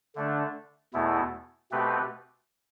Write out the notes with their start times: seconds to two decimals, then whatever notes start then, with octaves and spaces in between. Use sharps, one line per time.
0.15 D3 A3 D4
0.94 E2 B2 A3 E4
1.72 B2 A3 C4 G4 B4